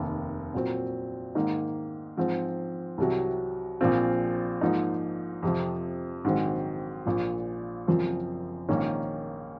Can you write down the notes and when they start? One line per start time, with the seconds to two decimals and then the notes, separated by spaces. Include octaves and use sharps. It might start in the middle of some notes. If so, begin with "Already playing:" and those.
Already playing: F1 D#2 D#3 A#3
0.54 A#2 F#3 C4
1.35 G#2 D#3 A#3 D#4
2.17 G#2 F3 C4
2.98 C2 C3 F#3
3.81 A#1 A#2 F3 C4 F4
4.61 G#2 F3 A#3 D#4
5.43 F2 C3 F3
6.24 A#1 G#2 D#3 F#3 C4
7.06 A#1 A#2 F3
7.87 F#1 F#2 F3 C4 F4
8.69 A#1 G#2 D#3 A#3 C#4